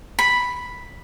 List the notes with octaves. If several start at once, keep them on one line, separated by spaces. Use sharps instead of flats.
B5